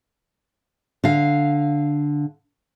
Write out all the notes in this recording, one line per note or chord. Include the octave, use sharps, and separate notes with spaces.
D3 F5